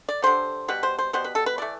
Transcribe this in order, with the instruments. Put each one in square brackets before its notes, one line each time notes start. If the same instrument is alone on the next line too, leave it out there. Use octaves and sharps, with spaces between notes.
[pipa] D5
D3 G3 B3 C5
B2 G3 B3 B4
C5
C5
B2 G3 B3 C5
B4
A4
B4
E3 A3 D5